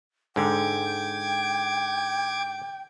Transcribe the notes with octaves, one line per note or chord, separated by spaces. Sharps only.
G#2 D3 G5 D6 G#6